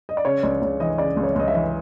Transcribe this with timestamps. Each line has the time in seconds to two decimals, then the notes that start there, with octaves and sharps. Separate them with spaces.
0.09 D#5
0.17 D5
0.25 C#3 C#5
0.43 C#2 D5
0.62 C#2 C#5
0.80 E3 D#5
0.98 C#3 D5
1.17 C#2
1.23 C#5
1.36 C#2 D#5
1.48 E5
1.54 E3